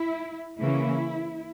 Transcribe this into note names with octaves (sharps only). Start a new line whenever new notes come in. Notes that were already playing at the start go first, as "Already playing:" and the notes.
Already playing: E4
C#3 E3 A#3 C#4 E4